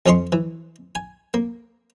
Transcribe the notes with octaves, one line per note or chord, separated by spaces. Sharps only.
F2 F3 C#4 D#5 C6 C#6
E3
G#5
A#3